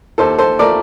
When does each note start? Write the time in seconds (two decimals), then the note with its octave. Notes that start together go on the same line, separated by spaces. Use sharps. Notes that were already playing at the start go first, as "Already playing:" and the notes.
0.18 D#2 A4 C5
0.38 A4 C5
0.59 A3 A#4 D5